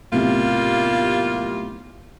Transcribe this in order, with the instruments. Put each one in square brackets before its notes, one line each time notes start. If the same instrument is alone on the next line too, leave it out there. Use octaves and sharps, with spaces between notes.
[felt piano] B1 A2 C3 [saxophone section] G3 A#3 F4